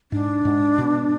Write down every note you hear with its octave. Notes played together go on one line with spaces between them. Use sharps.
G#2 D4
G#2
B2